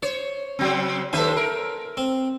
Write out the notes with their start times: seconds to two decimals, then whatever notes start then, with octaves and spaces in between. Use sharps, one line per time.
0.03 C5 C#5
0.59 C#3 F#3 C4
1.13 D#2 A4 B4 C5 E5 G#5
1.37 A#4
1.97 C4